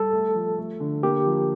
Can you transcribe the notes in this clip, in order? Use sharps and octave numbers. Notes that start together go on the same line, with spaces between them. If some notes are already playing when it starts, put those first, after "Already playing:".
Already playing: G3 A4
A3
F3
A3
D3
A#3 G4
F3